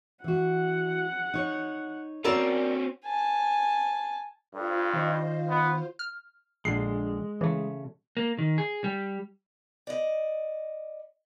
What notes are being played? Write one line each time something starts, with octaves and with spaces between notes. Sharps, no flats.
E3 F#4 F#5
D#4 C#5
C4 C#4 F#4 A4 A#4 C#5 D5
G#5 A5
G2 F4 A4 C5
D#3 D5 D#5
B3
F6
A#1 D3 G#3 C7
C#3 E3 A3
A#3
D#3
G#4
G3
D5 D#5